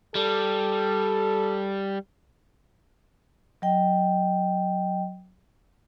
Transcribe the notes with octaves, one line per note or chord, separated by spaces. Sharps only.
G3 A4
F#3 D#5 G5